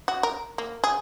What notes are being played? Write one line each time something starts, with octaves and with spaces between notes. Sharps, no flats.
F#4
A#4
A#3
G#4